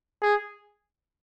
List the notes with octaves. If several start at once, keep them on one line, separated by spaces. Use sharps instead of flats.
G#4